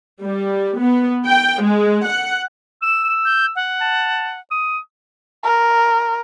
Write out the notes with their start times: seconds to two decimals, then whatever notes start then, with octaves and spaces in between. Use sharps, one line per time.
0.22 G3
0.79 B3
1.26 G5
1.62 G#3
2.06 F#5
2.82 E6 E7
3.25 G6
3.56 F#5
3.81 A5
4.51 D#6
5.44 A#4